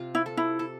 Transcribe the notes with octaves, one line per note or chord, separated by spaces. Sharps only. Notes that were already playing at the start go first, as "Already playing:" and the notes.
Already playing: C3 F4
E4
A4
E4
A4